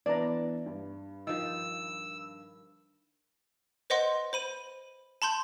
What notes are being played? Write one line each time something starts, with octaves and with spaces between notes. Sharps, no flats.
E3 B3 D4 D5 A#5
G2
D#3 F3 E6
B4 C5 D#5 F#5 C6
C5 B5 D#7
A5 B5 C6 G6